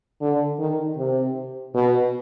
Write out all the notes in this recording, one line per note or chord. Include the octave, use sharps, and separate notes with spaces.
D3
D#3
C3
B2